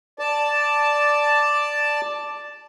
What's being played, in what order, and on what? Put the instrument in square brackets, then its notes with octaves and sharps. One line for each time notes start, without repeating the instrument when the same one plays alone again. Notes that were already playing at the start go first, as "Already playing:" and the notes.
[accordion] D5 A5